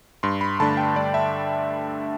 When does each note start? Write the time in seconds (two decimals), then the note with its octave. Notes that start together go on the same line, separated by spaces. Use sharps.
0.23 G2 C6
0.41 B5
0.60 D3 A3 D4 A5
0.77 G5
0.96 G2 D5
1.14 E5